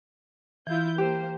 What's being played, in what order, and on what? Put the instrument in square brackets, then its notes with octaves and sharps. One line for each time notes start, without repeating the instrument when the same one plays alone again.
[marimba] E3 [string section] E4 F4 G6
[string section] A#3 C5 [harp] G4